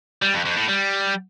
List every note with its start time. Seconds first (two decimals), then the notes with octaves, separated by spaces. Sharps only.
0.22 G3
0.34 F2
0.45 F2
0.57 A2
0.69 G3